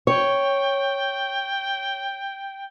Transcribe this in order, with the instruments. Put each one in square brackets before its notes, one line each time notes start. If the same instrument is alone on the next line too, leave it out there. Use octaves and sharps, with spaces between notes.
[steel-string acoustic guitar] C#5 [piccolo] G5